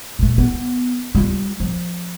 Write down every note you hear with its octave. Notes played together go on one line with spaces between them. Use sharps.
A#2 A3
B3
G3 F4
F3